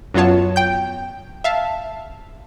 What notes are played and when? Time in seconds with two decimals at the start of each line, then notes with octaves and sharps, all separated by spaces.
0.14 F#2 F#3 B3 F4 C#5 A5
0.56 G5 G6
1.44 E5 F5 A5